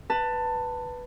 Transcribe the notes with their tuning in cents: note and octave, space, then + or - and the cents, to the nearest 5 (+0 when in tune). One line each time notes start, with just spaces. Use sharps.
B4 +0 A5 +20